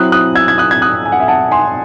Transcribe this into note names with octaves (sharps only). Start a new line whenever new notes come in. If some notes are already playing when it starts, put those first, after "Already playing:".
Already playing: F#3 C4 E4 D#6 F#6
D#6 F#6
E6 G#6
G#6
D#6 F#6
G#6
D#6 F#6
G#5
F#5
E5 G#5
F#5 A5
G#5 C6